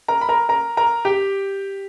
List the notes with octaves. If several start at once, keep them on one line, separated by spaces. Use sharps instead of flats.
A#4 A#5
B5
A#4 A#5
A#4 A#5
A#4 A#5
G4 G5